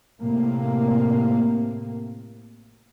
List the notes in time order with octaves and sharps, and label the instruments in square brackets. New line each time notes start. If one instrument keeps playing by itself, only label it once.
[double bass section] A2 C3 A#3